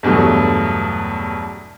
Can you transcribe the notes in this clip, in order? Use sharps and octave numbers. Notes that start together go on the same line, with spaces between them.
E2 G2 B2 F#3 A3